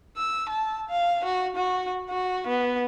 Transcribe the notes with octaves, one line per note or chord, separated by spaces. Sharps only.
E6
A5
F5
F#4
F#4
F#4
B3